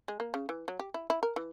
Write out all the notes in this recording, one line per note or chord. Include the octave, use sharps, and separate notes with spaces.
G#3
A#3
C#3
E3
F#3
G4
E4
E4
A#4
E3